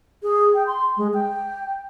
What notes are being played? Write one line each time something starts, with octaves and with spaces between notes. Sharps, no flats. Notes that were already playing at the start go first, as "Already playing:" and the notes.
G#4
G5
C6
G#3
G5